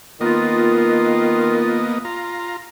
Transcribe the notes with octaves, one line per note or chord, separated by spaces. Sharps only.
D#3 A#3 B3 F4 D#5
F4 A#5